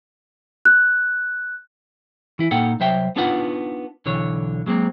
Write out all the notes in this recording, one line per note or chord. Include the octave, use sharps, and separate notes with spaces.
F#6
E3 E4
A#2 A#3 D#4 A4 F#5 G5
C2 F#3 C5 E5 G5
B3 D4 D#4 F4 B4 F#5
B1 D3 E3 C#5
F#3 G#3 A#3 C4